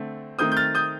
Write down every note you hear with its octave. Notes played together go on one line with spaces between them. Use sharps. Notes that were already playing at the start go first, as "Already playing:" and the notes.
Already playing: D3 A3 C4
D#3 A3 C4 D#6 G6
G6
F6 A6
D#6 G6